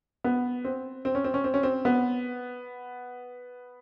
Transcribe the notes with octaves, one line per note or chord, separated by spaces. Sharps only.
B3
C4
C4
C#4
C4
C#4
C4
C#4
C4
B3